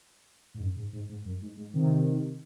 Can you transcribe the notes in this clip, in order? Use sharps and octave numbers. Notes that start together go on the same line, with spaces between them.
G#2
F#2
G#2
G#2
G#2
F#2
G#2
G#2
C3 D#3